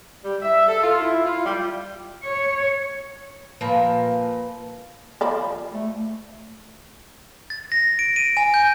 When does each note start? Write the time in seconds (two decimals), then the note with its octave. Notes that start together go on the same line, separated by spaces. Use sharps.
0.24 G3
0.42 E5
0.67 A4
0.83 F4
1.00 E4
1.25 F4
1.45 G3
2.23 C#5
3.61 A#2 F3 A#4 B4
5.21 F3 D5 B5
5.74 A3
7.50 A6
7.72 A#6
7.99 D7
8.16 D#7
8.37 G#5
8.54 G6